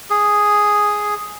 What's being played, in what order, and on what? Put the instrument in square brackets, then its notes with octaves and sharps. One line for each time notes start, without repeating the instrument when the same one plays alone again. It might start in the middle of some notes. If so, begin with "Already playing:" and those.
[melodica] G#4